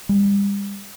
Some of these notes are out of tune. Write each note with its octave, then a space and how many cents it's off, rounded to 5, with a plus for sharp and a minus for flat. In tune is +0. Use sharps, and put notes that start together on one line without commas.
G3 +40